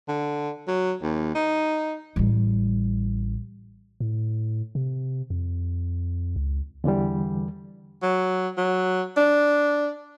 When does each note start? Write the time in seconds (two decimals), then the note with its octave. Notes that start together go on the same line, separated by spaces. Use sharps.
0.08 D3
0.67 F#3
1.02 D#2
1.35 D#4
2.16 A1 G3
4.00 A2
4.75 C3
5.30 F2
6.36 C#2
6.84 E2 D3 E3 G3
8.03 F#3
8.57 F#3
9.17 D4